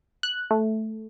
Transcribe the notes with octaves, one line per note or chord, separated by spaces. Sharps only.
F#6
A3